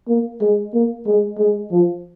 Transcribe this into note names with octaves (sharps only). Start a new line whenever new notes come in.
A#3
G#3
A#3
G#3
G#3
F3